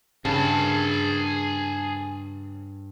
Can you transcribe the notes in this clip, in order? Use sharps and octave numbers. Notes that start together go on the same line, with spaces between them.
G2 C#3 G#4 A5